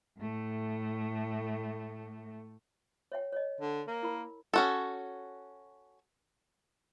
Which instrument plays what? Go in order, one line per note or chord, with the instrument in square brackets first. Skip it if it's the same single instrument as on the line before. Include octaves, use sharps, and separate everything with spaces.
[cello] A2 A3
[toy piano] C#5 E5 G5
C#5 D#5
[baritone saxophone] D3
A#3
[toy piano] E4 A#4 B5
[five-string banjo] C#4 F#4 A4